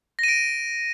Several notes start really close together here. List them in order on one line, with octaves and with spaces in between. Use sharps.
A#6 D#7 D7